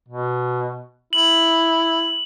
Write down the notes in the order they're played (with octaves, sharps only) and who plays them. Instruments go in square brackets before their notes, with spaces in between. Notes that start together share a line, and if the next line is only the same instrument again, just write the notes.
[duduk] B2
[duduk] E4 [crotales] F#7